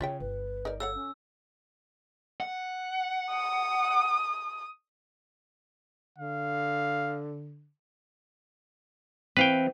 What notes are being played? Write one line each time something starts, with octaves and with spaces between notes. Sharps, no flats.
C#3 F4 C#5 E5 G5
G1 B4
D#4 A#4 D5
A4 C#5 F5 F#5 E6
C#4
F#5
D#6
D3 F5
E3 C4 B4 F5 G5